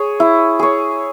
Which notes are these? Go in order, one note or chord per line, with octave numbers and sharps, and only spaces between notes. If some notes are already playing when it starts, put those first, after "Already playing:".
Already playing: G#4 C#5
E4
G#4 C#5